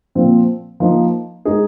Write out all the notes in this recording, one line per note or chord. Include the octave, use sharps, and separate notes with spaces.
A#2 F3 C4
F3 A#3 D#4
G#3 D#4 G#4